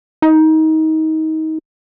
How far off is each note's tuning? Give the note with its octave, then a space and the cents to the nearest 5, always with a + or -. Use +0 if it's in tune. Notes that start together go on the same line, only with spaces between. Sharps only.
D#4 +25